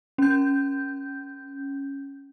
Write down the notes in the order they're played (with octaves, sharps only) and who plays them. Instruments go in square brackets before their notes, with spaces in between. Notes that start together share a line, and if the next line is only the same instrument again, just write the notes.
[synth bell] C#4 G6